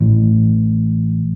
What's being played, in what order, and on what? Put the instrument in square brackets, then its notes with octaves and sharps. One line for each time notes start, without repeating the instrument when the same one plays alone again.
[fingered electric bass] A1 E3